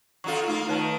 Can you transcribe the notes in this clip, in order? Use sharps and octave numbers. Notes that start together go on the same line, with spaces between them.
F#3 D#4 F4 A4 C#6
A3 A#3 D#4 F4
D#3 B4 C#5 A5